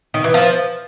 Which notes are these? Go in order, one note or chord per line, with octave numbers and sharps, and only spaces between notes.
D#3
E3
F3